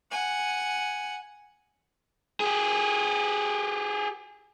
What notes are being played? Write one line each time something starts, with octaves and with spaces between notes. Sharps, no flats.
F#5 G#5
G4 G#4